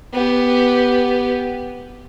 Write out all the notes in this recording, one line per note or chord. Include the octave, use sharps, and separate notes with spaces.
B3 G4